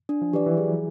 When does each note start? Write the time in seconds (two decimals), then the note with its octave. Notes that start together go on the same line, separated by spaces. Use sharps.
0.09 D4
0.22 F3
0.33 E3 G4 B4 D5
0.46 E3
0.57 F#3 G#4